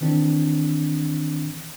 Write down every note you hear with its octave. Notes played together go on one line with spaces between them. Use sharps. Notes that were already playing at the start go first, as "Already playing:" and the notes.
D#3 E3 C4 D4